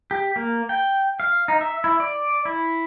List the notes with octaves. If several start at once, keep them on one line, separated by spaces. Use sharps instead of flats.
G4
A#3
G5
F5
D#4
E5
E4
D5
E4